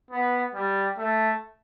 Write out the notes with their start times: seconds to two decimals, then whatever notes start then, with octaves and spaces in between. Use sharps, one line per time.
0.11 B3
0.54 G3
0.98 A3